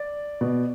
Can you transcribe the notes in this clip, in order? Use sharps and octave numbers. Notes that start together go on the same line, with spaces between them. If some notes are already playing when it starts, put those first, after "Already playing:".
Already playing: D5
B2